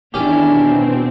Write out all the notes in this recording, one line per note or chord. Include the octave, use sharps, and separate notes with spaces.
E2 D#3 C#4 D4 E4 G4
B2 C4